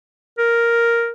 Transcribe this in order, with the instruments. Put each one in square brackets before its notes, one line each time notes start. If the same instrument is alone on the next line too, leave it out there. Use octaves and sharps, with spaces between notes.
[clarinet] A#4